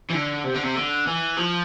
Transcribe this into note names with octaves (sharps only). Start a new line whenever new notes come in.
E3
D3
C3
D3
C3
D3
E3
F3